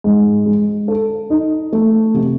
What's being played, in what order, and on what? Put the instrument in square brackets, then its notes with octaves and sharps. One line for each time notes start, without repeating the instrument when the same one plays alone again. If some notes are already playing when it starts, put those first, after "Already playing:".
[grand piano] G#2
G#3
A4
D#4
A3
C3